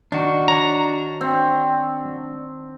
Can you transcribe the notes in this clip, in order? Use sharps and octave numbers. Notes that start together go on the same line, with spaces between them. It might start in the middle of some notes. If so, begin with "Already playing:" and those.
D#3 D4 F#4
C#5 A#5
C4